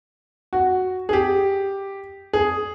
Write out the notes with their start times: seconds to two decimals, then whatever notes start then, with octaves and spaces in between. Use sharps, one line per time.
0.53 F#4
1.09 G#4
1.13 G4
2.33 G#4